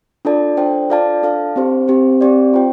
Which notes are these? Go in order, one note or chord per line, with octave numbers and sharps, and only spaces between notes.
D4 F4 A4 D5 A5
D4 A4 C5 G5
F4 A4 D5 F5 A5
D4 A4 F5 A5
C4 G4 C5
C4 G4 C5
C4 G4 D5
F4 C5 G5